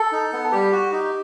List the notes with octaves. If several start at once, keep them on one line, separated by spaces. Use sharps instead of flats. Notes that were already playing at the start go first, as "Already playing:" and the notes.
Already playing: A4
D#4
B3
G3 G4
F#4
D#4